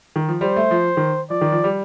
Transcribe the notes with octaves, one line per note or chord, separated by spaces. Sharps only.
D#3
F3
G3 C5
A3
F3
D#3
F3 D5
D#3
F3
G3